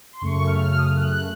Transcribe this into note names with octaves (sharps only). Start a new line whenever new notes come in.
C6
F#2 C#3 A3 C#6
F6
F6
D#6
F6
F#6